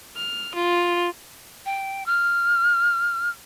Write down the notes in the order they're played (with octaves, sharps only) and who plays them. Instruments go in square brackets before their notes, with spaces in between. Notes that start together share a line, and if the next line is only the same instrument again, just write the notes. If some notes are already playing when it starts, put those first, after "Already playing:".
[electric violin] F6
F4
[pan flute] G5
F6